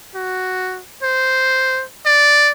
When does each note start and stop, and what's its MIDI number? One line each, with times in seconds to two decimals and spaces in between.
0.15 0.80 66
1.03 1.84 72
2.06 2.51 74